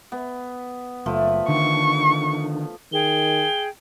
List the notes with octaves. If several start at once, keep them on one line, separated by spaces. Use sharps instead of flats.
B3
F#1 F3 A3 B4
D3 D#3 C#6
D#3 G#4 G5 G7